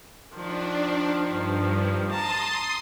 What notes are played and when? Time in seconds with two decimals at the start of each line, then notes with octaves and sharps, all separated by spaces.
0.35 D#3 F3 D4
1.28 G2
2.10 A5 A#5 C6 D#6